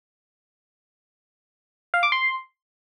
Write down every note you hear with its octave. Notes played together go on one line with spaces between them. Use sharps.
F5
D6
C6